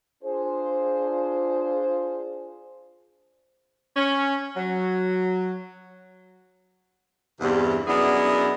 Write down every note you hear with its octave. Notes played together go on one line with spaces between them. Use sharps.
D4 F4 G#4 C5
C#4
F#3
E2 G2 C3
F#2 B3 D4 E4 G#4 D#5